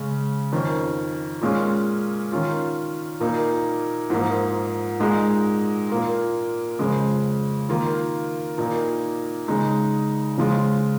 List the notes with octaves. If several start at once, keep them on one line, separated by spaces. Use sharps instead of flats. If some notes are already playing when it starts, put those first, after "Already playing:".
Already playing: C#3 G#3 C#4
F2 D#3 C#4
A#2 G#3 C#4 F4
D#3 C#4 F4
A#2 A#3 D#4
G#2 F3 A#3 D#4
A#2 G#3 D#4
A#2 A#3 F4
F2 C#3 G#3
D#3 A#3 F4
A#2 A#3 D#4
C#3 G#3 D#4
C#3 F3 G#3 F4